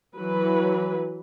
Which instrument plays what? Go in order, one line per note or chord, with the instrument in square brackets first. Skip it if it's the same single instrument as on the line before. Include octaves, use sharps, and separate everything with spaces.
[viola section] E3 F#3 B4